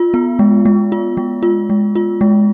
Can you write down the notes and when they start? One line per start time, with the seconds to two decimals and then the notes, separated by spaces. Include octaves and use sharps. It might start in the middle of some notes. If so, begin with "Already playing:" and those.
Already playing: F4
0.14 B3
0.39 G#3
0.65 G#3
0.92 F4
1.17 G#3
1.43 F4
1.70 G#3
1.95 F4
2.21 G#3